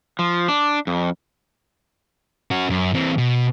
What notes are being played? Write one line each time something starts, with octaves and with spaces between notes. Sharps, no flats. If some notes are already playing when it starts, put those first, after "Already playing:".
F3
D4
F2
C#4 F#4
F#2
E3 C4
B2